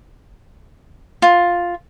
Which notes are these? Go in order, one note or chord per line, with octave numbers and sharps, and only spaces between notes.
F4